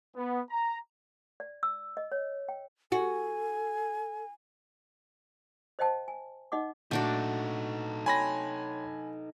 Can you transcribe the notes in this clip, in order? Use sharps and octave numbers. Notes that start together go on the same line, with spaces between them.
B3
A#5
D5
E6
D#5
C#5
G5
F#4 A4 G#5
C5 D#5 F5 G5 A5
G#5
D#4 D#5 F#5 D6
A#2 A3 D4 D#4 F#4 A4 F#5 G6
C#5 G5 G#5 B5 C6 A#6